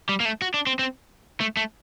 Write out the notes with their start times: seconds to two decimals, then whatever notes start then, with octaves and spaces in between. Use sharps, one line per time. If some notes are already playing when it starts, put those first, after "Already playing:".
0.09 G3
0.20 A#3
0.25 A3
0.42 F#4
0.54 D4
0.67 C4
0.79 C4
1.40 A3
1.57 A3